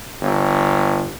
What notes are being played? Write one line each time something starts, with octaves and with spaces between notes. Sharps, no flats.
G1